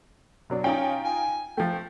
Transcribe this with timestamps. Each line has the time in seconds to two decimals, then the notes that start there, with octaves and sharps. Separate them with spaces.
0.50 B2 F#3 D4
0.64 C#4 D#4 F4 G5
1.05 G#5
1.57 F3 A3 G5